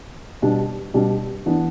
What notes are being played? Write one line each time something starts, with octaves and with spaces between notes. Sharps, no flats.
B2 G3 D4
B2 G3 D4
E3 B3 D4